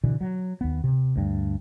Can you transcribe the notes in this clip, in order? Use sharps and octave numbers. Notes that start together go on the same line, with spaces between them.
B2 D3 E3
F#3
D#2 B3
C3
D2 G2